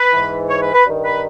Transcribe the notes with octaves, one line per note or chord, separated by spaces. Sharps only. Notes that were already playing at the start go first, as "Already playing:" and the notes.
Already playing: B4
G#2 E3
C#5
B4
B4
G2 D#3
B4